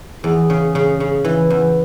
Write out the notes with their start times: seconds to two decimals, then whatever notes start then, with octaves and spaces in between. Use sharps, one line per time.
0.24 E2 G#4
0.50 C#3
0.75 C#3
1.00 C#3
1.25 E3
1.50 E2